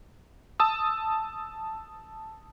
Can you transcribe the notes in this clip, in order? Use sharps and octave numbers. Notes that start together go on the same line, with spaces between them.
A5 D#6 E6